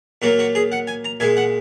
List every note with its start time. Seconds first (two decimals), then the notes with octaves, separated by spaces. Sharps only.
0.22 A#2 F#3 A#3 F#4
0.39 F#4
0.55 G#4
0.72 F#5
0.87 G#5
1.05 A#5
1.20 A#2 G#3 G#5
1.37 F#5